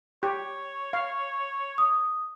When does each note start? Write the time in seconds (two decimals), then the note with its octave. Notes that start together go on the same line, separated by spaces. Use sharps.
0.23 G4 C#5
0.93 F5
1.78 D#6